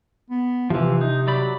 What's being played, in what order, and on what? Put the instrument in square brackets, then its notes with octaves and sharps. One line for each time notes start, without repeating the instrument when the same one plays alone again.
[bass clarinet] B3
[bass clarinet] C3 [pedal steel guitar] E3 F3
[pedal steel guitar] D#4
F#3 D5 B5